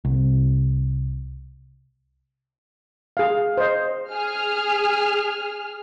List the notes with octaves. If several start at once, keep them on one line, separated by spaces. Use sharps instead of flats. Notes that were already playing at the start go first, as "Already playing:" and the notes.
C2
G#4 F5
C5 D#5
G#4 F6